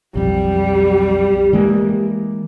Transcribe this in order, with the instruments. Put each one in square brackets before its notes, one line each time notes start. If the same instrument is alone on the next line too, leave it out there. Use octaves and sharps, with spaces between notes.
[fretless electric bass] B1 F2 [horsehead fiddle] G3
[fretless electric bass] E3 G#3 A#3